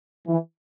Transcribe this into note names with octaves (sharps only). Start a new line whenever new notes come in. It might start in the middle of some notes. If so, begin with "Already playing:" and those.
E3